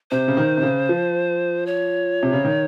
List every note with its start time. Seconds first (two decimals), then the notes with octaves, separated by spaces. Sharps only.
0.11 C3 C5
0.28 C#3
0.37 D#3
0.57 C3
0.63 C#3
0.89 F3
1.66 C#5
2.23 C3
2.33 C#3
2.45 D#3